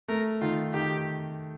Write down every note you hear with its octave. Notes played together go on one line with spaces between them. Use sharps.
A3 A#4
D#3 F4
D#3 G4